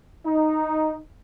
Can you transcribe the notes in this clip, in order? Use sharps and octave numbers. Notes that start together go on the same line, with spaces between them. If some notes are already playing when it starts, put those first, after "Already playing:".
D#4